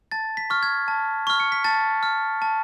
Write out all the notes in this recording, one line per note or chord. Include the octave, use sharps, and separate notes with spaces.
A5 A6
B6
C#6 F6
G#6
A5
C#6 F6
C#7
B6
A5 A6
F6
A5